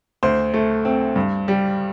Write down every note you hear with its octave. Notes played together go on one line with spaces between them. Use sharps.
D2 C5
A3
C4
G2
G3